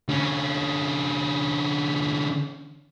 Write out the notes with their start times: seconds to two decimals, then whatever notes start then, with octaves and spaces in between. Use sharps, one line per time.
0.09 D3 C#4